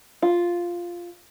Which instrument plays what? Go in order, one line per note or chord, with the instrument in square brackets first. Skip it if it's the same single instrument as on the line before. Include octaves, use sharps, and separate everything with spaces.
[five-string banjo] F4